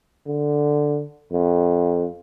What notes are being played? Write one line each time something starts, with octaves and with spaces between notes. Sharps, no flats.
D3
F2